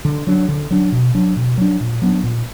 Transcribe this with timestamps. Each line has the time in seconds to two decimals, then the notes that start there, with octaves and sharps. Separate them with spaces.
0.05 D3
0.27 F#3 D4
0.48 D3
0.71 F#3 D4
0.92 B2
1.14 F#3 D4
1.36 B2
1.58 F#3 D4
1.80 A#2
2.02 F#3 B3 D4
2.23 A#2